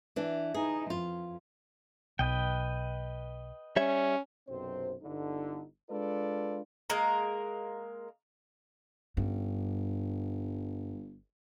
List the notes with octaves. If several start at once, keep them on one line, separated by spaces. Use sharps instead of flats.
E3 D4
D#4 E4 G#4
F2 F4
B1 B4 D#5 G5
G3 C#4 C#5 E5
B1 F#2 C3 C4 C5
G1 D3 D#4
G#3 D4 F4 A4 B4 D5
G#3 A#3 A#4
G1 G2 C#4